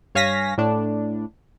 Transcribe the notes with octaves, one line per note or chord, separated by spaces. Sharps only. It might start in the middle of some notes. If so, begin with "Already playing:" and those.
G2 C#5 F5 G#5 A#6 B6
A2 D4